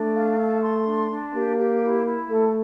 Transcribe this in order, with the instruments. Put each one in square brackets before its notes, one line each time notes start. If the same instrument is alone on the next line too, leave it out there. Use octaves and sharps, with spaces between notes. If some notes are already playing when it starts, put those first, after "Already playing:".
Already playing: [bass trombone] A3 [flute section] D4
[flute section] F5
A4
C6
D4
D4
[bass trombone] A#3 [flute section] G4
[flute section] G4
E4
E4
[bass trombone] A3 [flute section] A4